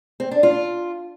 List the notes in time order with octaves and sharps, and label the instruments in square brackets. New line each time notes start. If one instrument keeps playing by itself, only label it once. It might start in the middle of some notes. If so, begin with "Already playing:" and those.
[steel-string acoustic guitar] C4
D4
F4